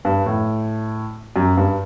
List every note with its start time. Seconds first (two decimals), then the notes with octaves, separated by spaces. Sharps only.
0.05 G2
0.26 A2
1.36 F#2
1.57 G2